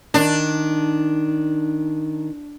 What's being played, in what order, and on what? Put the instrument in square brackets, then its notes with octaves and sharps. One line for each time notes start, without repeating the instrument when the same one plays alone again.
[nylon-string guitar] D#3 [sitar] D4